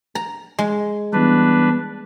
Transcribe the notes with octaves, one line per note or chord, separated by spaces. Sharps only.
A#5
G#3
E3 G3 B3 D4 B4